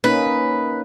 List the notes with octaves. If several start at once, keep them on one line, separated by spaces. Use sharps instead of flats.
A#3 C#4 D#4 B4